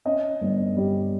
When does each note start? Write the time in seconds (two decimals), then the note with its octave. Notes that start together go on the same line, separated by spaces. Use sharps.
0.05 C#4 D#5
0.41 G1
0.77 G3